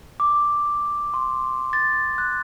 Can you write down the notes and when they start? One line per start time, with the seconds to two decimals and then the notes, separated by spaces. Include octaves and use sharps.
0.20 D6
1.14 C6
1.73 A6
2.18 F#6